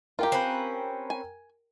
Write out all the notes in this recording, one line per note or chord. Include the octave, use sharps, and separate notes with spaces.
F4 G4 A#4 G5 A#5
C4 C#4 B4
G#5